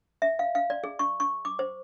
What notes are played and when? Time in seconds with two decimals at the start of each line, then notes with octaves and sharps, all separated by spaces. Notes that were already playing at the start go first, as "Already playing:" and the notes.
0.22 E5
0.39 F5
0.55 F5
0.70 D5
0.84 G#4
0.99 C#6
1.20 C#6
1.45 D6
1.59 C5